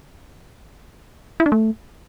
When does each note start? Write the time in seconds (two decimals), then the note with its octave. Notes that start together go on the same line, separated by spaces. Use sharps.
1.40 E4
1.46 D4
1.52 A3